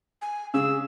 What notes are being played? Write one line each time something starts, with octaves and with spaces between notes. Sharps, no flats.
G#5
C#3 G#4 E6